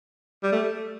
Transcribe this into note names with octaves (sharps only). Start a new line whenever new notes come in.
G3
A3